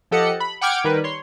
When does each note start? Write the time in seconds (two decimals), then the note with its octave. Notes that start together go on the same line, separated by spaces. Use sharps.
0.11 F3 G4 A4 D#5 F#5 C#7
0.40 B5
0.61 F#5 G5 D6 F6 G#6 D7
0.85 D#3 G3 A#4 B4
1.04 C#5 C6